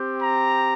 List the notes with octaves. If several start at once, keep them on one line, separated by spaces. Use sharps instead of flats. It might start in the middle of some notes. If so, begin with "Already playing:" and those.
Already playing: C4 G4
A#5